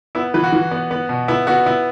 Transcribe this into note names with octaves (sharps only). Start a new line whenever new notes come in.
B3 E4
E3 B4
F#4
E3
B3
B3
B2
B3 E4
B3 F#4
B3 E4